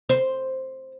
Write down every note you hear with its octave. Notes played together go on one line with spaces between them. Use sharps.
C5